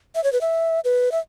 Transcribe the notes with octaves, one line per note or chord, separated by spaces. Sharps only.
E5
C#5
B4
E5
B4
E5